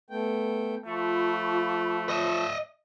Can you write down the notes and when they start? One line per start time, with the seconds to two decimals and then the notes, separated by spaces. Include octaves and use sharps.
0.10 A3 B3 G5
0.86 F3 A3 F4 B5 C#6
2.09 D#5 E5